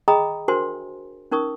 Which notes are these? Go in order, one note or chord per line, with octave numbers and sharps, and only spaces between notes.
G#4 D#5 G5 A#5 B5 D#6
D4 F#4 A#4 C5 G#5 C6
C#4 D#4 A#4 C#6 D#6